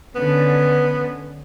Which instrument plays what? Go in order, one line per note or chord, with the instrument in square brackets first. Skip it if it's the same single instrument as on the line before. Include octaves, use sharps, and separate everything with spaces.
[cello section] D3 C#4 [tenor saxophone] B3